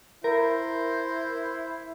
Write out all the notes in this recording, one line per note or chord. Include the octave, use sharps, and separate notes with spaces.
E4 A#4 C5